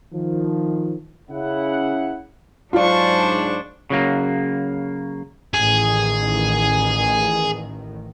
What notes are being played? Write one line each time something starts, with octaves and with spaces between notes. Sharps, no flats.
D#3 F3
C#3 E4 F#5
G#2 F#3 D4 F4 C5 D5 C#6
C#3 F#3 A#3
A1 D#3 G#4